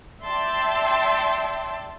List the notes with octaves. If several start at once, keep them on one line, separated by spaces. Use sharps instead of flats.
D5 E5 G5 A5 C6